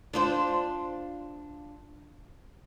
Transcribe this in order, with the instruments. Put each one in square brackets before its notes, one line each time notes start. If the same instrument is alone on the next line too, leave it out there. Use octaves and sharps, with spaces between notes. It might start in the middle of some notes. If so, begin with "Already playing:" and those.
[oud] D4 F4 C5